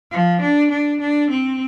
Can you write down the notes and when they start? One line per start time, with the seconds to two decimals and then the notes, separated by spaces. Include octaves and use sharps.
0.11 F3
0.41 D4
0.71 D4
1.00 D4
1.30 C4